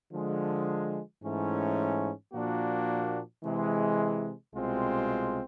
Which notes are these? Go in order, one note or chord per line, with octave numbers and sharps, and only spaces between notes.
D3 F3 G#3
G#2 E3 A3 C#4
A#2 F3 A#3 D4 F#4
C3 E3 G#3
C2 B2 G#3 C4 F4